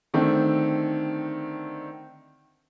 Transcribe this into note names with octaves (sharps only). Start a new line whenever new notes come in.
D3 D#3 A3 C4 D4